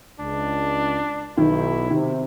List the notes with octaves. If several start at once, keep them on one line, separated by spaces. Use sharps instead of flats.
C#2 D4
B1 D#3 E4
C3 D#3